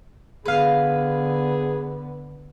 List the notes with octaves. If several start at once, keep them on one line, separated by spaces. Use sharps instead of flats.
D3 B3 G#4 B4 F5